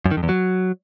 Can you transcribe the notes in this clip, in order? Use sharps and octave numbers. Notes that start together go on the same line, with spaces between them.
F#2
D#3
F2
E2
F#3